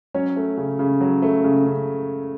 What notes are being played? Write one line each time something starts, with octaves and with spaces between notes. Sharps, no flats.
F#3 C#4 C#5
A3
C#3
C#3
F#3
A3
C#3
C#3